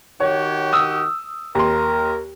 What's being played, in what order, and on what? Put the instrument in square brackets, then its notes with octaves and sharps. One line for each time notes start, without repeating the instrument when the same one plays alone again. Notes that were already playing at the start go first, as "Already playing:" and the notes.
[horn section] D#3 F#4 G4 [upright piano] C#5
[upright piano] D#6 E6
[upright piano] D#2 C6 [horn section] A#4